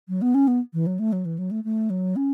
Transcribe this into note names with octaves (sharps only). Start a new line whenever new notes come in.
F#3
B3
C#4
B3
E3
F#3
A3
F#3
E3
F#3
A3
A3
F#3
C#4